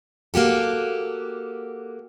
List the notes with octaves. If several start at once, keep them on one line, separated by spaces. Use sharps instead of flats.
A#3 F#4 G4 A4